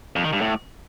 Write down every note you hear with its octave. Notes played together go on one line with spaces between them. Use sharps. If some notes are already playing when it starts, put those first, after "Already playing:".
F2
D#3
G2
A2